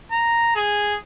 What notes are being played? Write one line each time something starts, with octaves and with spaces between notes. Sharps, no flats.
A#5
G#4